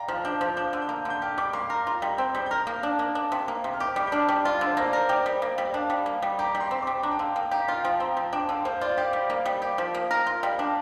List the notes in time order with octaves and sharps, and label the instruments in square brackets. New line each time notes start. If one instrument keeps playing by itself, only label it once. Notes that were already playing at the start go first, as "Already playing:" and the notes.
Already playing: [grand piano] D5 F5 G5 A#5
[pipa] F3 [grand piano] F6
[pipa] D4 [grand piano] G6
[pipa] F3 [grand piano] F6
[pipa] D4 [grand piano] G6
[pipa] D3
[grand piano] G6
[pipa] A#3
D3
[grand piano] G6
[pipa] G4 [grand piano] F6
[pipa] G3 [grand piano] D6
[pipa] A#3 [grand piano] C6
[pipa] A#4 [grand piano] A#5
[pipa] F4 [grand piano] A#5
[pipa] G3 [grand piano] A#5
[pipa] C4 [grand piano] G6
[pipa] G3 [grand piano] G6
[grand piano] G6
[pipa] A#4 [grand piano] F6
[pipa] A#3
D4
A#3
D4
C3
A#3
C3
[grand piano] F6
[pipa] G4 [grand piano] D6
[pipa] G3 [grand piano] F6
[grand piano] G6
[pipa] D4 [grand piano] F6
[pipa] G3 [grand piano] D6
[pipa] F4 [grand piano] D5
[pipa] D3
[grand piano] C5
[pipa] A#3 [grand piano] C5
[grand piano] D5
[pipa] A#4
[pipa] G4 [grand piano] D5
[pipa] G3
A#3
G3
[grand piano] D5
[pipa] D4 [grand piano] F5
[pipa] G3
A#3
G3
[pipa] G4 [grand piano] A#5
[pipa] G3
[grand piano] C6
[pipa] C4
[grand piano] D6
[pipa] G3
[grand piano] G5
[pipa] D4 [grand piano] A#5
[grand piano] G5
[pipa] D3 [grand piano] F5
[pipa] A#3 [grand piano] G5
[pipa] G4 [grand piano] A#5
[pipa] F4 [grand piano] F5
[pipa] F3 [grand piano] G5
[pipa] C4 [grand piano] A#5
[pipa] F3
[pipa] D4 [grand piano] G5
[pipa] D3 [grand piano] F5
[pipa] A#3 [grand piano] C5
[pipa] F4 [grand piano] D5
[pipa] G4 [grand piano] F5
[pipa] G3
A#3
G3
G4
F3
A#3
A#4
[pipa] F4 [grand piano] F5
[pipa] G3 [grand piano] G5
[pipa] D4 [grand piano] F5